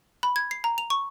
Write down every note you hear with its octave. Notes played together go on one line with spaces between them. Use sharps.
B5
G#6
C7
A#5
F7
C#6